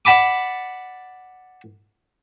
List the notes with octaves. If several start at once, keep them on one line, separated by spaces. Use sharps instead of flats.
D5 F#5 A5 B5 D6